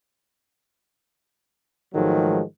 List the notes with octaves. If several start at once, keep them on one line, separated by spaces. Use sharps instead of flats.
G#2 D#3 F3 F#3 G#3 A3